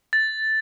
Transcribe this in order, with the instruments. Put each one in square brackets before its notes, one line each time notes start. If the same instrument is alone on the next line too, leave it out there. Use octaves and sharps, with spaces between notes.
[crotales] A6